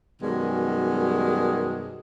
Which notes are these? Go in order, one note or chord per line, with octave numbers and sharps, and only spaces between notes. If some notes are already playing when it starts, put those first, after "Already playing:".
F#2 B2 D#3 G3 G#3